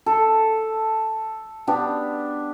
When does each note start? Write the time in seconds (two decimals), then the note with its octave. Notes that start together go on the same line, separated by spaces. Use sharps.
0.06 A4
1.67 B3 D4 G4